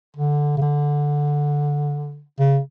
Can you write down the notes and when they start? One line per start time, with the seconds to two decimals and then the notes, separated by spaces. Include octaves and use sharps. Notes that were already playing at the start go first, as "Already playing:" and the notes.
0.17 D3
0.57 C#3
0.62 D3
2.39 C#3